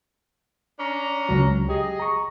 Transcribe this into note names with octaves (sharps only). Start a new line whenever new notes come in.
C#4 D4 A#5
C#2 F#3
G4 G#4 D#5
A#5 C#6